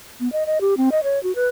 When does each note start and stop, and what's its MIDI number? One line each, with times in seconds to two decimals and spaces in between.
0.20 0.31 59
0.32 0.44 75
0.46 0.58 75
0.61 0.74 67
0.77 0.89 60
0.92 1.00 75
1.03 1.21 73
1.23 1.35 66
1.35 1.48 71